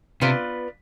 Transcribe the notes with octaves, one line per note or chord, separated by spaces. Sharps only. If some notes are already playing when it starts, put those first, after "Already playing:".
C3 B3 F4 B4 D5